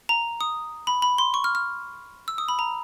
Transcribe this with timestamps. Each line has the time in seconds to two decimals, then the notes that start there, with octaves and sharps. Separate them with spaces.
0.09 A#5
0.41 D#6
0.87 B5
1.02 B5
1.18 C6
1.34 C#6
1.44 F6
1.55 F6
2.28 E6
2.38 D#6
2.48 B5
2.59 A#5